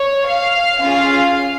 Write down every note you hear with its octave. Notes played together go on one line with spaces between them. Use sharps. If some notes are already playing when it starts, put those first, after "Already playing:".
Already playing: C#5
F5
C#4 F4 G#4 F5